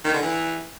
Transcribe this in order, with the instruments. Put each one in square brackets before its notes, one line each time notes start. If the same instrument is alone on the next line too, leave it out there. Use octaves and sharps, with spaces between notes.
[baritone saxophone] D#3
D3
E3